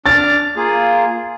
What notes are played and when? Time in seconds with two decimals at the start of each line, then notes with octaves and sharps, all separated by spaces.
0.06 D4 D6 F6 A6
0.56 A#3 F4 G#4